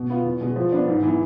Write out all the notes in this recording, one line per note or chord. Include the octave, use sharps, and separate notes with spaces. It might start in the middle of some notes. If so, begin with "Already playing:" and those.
Already playing: B2
B3 F4
E2
B2 G#3
F3
B3 D4
G#2
E3 B3